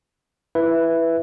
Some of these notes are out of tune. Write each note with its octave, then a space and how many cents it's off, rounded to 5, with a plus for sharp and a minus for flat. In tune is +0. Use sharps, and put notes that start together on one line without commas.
E4 +10 B4 +0 E5 +5